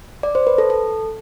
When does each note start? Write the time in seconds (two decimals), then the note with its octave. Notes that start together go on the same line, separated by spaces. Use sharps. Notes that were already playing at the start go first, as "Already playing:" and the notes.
0.23 D5
0.35 C5
0.47 B4
0.58 A4
0.70 A4